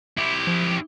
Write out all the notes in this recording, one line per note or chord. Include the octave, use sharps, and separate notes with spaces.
E4 G4
F3